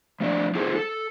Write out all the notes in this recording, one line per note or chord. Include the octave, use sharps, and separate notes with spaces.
F3 A3 D4 D5
D#4 F4 G#4 A4 C5
A4